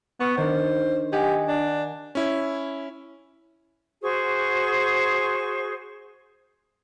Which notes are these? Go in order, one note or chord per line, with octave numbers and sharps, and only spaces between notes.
B3 C#6 F6
D#3 D4 C5
G4 D#5 F#5 G#5
D4
C#4 E4
F#4 G#4 C5 C#6